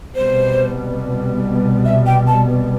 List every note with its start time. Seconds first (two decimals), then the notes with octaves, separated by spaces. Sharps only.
0.15 C2 B2 G3 B3 C5
1.85 E5
2.06 G5
2.27 A5